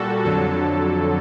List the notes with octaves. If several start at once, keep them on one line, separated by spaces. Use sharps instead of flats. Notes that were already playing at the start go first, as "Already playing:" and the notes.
Already playing: A#2 G3 F#4 A4
F2 D3 F#3 A4